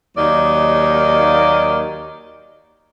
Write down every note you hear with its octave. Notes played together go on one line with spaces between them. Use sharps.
D#2 F#3 A#3 D#4 D5 D#5